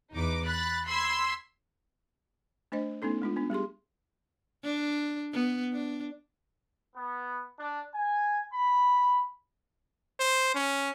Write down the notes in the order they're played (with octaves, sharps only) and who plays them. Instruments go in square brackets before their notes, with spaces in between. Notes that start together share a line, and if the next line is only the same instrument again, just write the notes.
[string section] E2 D#4 B4 D6
B5 F#6 A6
B5 C6 E6 G#6
[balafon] A3 D4 C5 D#5
A3 B3 C#4 D#4 A4
G#3 D4 F4
B3 D4
G3 G4 G#4 C6
[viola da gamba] D4
B3
D4
[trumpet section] B3
D4
G#5
B5
[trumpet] C5
C#4